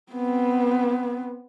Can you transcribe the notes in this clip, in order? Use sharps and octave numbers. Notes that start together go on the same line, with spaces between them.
B3 C4